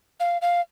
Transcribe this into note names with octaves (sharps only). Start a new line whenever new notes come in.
F5
F5